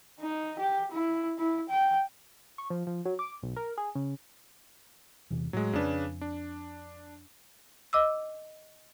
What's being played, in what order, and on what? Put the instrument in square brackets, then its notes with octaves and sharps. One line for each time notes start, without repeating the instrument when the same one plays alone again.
[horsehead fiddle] D#4
G4
E4
E4
G5
[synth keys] C#6
F3
F3
F#3
D6
B1
A#4
G#4
C#3
[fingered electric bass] E2 C3 E3
[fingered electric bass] A2 [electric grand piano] F#3 G#3
[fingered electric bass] F2 [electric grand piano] C#3 D4 B4
[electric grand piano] D4
[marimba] D#5 D6 E6